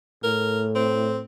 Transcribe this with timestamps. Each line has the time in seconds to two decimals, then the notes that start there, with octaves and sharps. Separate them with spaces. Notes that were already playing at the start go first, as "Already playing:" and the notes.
0.23 A2 A#4
0.75 C4